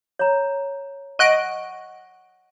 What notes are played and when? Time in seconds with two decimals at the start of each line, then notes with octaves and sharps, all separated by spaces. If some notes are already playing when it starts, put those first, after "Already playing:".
0.19 C#5 A#5
1.19 D#5 F#5 C#6 F#6 D7